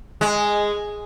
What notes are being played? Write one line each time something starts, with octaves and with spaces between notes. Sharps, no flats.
G#3